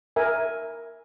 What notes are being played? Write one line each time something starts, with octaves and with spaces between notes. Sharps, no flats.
A#4 E5 G#5